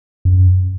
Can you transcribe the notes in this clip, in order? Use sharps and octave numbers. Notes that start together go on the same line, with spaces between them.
F#2